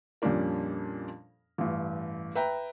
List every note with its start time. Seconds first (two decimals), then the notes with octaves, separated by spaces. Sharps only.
0.22 F2 A#2 G3 C#4 D4 A#4
1.58 A1 G2
2.35 B4 E5 G5 A#5